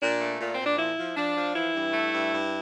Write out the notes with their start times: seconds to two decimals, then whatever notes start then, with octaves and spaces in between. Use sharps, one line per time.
0.01 A#2 D4
0.20 A3
0.40 A#2
0.54 A#2 C4
0.66 D4
0.78 F3 E4
0.97 F3
1.16 F3 D4
1.36 F3
1.55 E3 E4
1.75 G2
1.93 A3
2.12 G2
2.32 G2